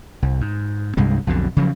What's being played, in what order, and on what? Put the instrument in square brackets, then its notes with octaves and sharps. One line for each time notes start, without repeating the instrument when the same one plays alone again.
[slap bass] C2
G#2
C2 G2 C3 G#3
B1 F2 B2 D3
C#3 F3 F#3